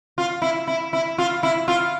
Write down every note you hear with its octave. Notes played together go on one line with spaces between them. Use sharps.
F4
E4
E4
E4
F4
E4
F4